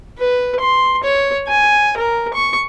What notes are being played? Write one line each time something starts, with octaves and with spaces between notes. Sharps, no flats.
B4
C6
C#5
G#5
A#4
C#6